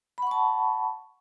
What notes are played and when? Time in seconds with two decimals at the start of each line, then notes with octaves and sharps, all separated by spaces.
0.18 B5
0.22 F#5
0.27 C#6
0.31 A5